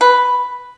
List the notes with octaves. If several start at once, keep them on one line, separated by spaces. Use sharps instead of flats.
B4